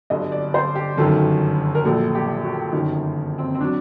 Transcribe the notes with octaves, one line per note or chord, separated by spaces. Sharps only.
G1 G2 D3 F#3 D#5
D5
C5
G4
G1 F#2 D#3 F#3 A4
A#4
A#1 A#2 F#3 A4
G4
F#4
G1 F#2 D#3 D#4
C4
C4
F#3 D4